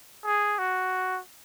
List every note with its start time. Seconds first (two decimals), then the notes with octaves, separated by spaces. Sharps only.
0.25 G#4
0.59 F#4